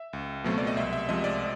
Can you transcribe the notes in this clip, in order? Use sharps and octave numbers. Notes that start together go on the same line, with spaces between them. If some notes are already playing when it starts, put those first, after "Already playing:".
Already playing: E5
C#2
B2 F#3 A3 C4
D5
D#5
C2 E5
E5
C3 F3 G#3 D#5
D5